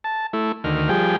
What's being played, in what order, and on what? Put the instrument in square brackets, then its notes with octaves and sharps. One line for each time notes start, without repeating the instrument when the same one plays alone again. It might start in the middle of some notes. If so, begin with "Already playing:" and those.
[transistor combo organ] A5
A3 E4
D2 D#3 F6
F3 G3 G#4 G5